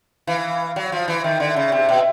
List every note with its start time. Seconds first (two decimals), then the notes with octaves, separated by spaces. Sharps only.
0.27 E3 F5
0.76 F#3
0.92 F3
1.08 E3
1.24 D#3 E5
1.40 D3
1.47 E5
1.56 C#3
1.72 C3
1.89 B2